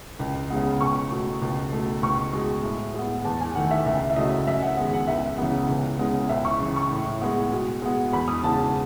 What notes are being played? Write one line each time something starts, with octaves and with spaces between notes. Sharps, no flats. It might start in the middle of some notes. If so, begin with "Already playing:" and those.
C#2
C#3 G#3 B3
C#2 C#6
B2 A3
C#2
B2 A3
C#2 C#6
B2 G#3
A2
G#3 B3
E2 A5
G#5
D#3 A3 F#5
E5
C#2 E5
E5
C#3 F#3 A3 D#5
F#2 E5
F#5
D#3 G#3 B3
F#5
C#2 E5
C#3 E3 G#3 B3
C#2
C#3 G#3 B3
C#2 E5
C#6
C#3 E3
C#6
A2
G#3 B3
B2
G#3 B3
E2 B5
D#6
C#3 G#3 B3 A5
A5